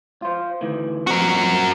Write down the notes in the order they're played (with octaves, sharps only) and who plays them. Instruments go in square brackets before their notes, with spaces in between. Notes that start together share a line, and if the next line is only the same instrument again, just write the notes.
[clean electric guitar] F4 C5
D2 D#3 E3
[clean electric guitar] F2 A#2 C4 [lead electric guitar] F#4 A#4